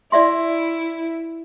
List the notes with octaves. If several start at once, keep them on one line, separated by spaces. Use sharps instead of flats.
E4 D5 E5 C6